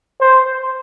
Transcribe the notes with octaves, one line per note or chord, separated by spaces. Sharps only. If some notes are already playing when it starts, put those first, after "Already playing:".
C5